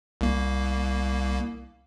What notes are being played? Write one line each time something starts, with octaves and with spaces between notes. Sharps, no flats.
C2 A#3